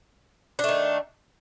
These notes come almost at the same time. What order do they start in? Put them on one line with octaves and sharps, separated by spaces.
D4 A3 D#3